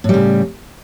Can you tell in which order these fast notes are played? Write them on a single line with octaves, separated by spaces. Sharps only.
A2 G3 C#3